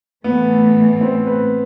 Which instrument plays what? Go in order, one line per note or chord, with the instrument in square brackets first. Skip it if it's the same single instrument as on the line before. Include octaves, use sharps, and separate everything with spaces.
[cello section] A2 E3 A3 [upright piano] B3
[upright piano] C4
B4